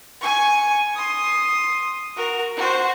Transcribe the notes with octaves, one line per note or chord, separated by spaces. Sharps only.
G#5 C#6
C6 D#6
F#4 A#4
F#4 C5